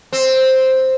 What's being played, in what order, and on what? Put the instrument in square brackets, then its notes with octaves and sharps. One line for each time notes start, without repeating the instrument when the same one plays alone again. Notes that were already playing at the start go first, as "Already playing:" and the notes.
[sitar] C4